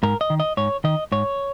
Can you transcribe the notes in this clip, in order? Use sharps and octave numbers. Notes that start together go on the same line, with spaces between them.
G#2 A#4
D#5
D#3
D#5
G#2 C#5
D#3 D#5
G#2 C#5